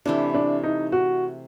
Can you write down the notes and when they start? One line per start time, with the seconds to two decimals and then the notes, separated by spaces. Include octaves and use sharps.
0.06 C3 E3 A3 D4
0.34 D4
0.63 D#4
0.92 F#4